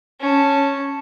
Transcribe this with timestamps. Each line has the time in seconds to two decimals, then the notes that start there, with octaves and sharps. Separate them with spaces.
0.20 C#4 A5